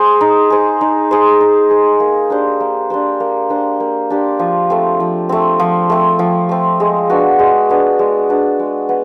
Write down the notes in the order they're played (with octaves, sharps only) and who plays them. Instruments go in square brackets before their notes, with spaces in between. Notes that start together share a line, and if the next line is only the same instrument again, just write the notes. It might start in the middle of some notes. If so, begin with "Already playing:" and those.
Already playing: [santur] G#4 C5
D#4
G#4 C5
D#4
G#4 C5
D#4
G#4 C5
A#3
D4 G4 C5
A#3
D4 G4 C5
A#3
D4 G4 C5
A#3
D4 G4 C5
F3
A3 C4
F3
A3 C4
F3
A3 C4
F3
A3 C4
G#3
B3 D4 F#4
G#3
B3 D4 F#4
G#3
B3 D4 F#4
G#3
B3